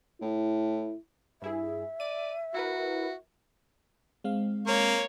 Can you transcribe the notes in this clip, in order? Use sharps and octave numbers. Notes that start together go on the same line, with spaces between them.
A2 E4
G2 E4 G#4 E5
D5 D#7
E4 F#4 A#4 B4
G#3 C4 F5
A#3 C#5